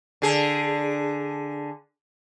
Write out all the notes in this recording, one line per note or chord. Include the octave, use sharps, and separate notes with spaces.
D3 G#4